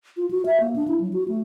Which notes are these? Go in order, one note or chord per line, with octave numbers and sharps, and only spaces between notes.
F4
F#4
E5
A#3
D4
E4
F#3
F#4
A3